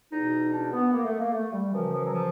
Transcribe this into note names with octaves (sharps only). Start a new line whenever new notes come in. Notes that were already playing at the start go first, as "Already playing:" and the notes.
E2 B2 D#4
D4
B3
A#3
A3
A#3
A3
G3
F#2 C#3 E3 F3
F3
F#3
F3